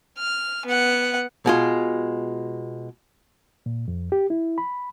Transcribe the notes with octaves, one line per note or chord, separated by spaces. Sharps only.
F6
B3 F#5
B2 G#3 F4
A#2
F2
G4
E4
B5